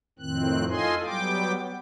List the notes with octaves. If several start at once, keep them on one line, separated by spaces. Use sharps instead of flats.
F2 A2 D#3 C4 F#6
F4 A4 D#5 G#5 C6
F#3 G3 B3 G5 D6